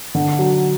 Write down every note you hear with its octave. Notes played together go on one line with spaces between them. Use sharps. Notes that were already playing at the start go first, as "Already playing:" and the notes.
D3
F#3